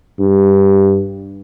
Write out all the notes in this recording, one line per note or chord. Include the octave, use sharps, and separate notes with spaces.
G2